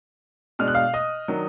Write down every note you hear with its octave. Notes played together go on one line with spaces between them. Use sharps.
B2 G#3 D4 F6
F#6
F5 F6
D#5 D#6
D#3 F#3 D4